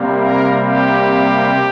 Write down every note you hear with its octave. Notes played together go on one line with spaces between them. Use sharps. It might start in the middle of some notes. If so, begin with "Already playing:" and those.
Already playing: C3 G3 A#3
A#4
G4